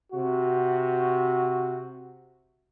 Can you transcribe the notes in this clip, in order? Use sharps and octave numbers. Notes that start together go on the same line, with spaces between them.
C3 F#4